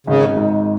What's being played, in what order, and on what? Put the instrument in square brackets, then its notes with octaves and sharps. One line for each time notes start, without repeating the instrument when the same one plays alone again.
[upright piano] G#1 [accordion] C#3
[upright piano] G#2